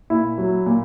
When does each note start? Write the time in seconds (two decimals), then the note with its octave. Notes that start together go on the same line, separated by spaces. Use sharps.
0.10 A#2 E4
0.38 F#3
0.66 A#2